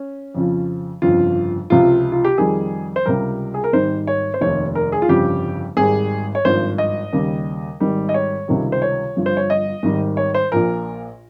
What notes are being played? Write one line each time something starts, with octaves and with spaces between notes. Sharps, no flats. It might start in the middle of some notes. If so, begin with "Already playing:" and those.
Already playing: C#4
F2 C#3 F3
G1 F2 C#3 F4
C#2 C3 F3 F4
F4
G4
F2 D#3 G3 G#4
C5
C#2 C3 G3 A#4
G#4
A#4
G#1 G#2 D#3 G3 C5
C#5
C5
F1 D#2 D#3 C#5
A#4
G#4
F4
G1 F2 C#3 G3 G4
G#1 G#2 G3 G#4
C#5
G#1 G2 F3 C5
D#5
D#2 C#3 G3
G#1 G#2 D#3 G3
D#5
C#5
C#2 C3 D#3 G3
C5
C#5
G1 G2 F3
C5
C#5
D#5
G#1 G#2 D#3 G3
C#5
C5
A#1 A#2 F3 A#4